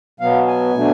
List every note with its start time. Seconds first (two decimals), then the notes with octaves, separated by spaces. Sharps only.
0.20 B2 F#3 B3 F5
0.47 G#5
0.74 B2 F#3 A3 D4